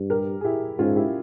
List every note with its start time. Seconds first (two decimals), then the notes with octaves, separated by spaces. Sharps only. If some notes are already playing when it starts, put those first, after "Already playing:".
Already playing: G2
0.10 G4 A#4
0.41 G#4
0.44 E4 G4
0.79 G#2 C#4 F4
0.96 E4 G4